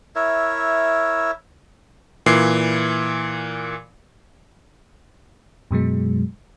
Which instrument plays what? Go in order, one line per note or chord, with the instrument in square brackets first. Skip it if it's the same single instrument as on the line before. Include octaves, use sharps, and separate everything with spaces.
[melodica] E4 A#4 C#5 E5
[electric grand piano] A#2 E3 C7
[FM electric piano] F#2 B2 F#3 G#3